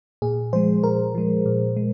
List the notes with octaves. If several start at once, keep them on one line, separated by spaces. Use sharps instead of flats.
A#2 G#4
F3 G#3 C5
A#2 A#4
F3 G#3
A#2
G#3